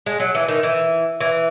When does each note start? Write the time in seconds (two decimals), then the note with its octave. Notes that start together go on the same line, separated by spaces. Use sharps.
0.06 G#3
0.20 F#3
0.35 E3
0.49 D#3
0.63 E3
1.21 E3